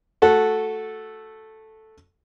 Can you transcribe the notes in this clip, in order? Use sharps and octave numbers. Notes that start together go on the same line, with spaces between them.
A3 F#4 A4